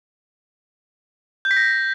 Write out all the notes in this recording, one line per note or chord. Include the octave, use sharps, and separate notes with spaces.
G6
B6
A#6